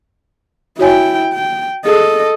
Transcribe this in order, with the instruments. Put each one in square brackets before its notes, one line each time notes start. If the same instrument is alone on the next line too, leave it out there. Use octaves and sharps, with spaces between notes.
[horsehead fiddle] E4 G5 [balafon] F#4 C#5 G#5
[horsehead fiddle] G5
[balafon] G#4 [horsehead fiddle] A4 D#5